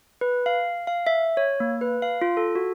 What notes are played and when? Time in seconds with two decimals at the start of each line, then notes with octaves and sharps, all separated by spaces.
0.21 B4
0.46 F5
0.87 F5
1.07 E5
1.37 C#5
1.60 A#3
1.81 B4
2.02 F5
2.22 F4
2.37 A4
2.55 F#4